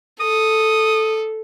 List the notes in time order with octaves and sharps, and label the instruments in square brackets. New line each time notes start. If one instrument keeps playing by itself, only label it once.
[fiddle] A4 [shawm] D#6